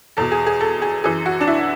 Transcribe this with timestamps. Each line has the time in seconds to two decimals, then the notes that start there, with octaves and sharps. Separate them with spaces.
0.17 E2 B2 A4
0.31 G#4
0.46 G#4
0.61 A4
0.82 G#4
1.04 F#2 E3 G#4
1.26 F#4
1.41 D4
1.47 E4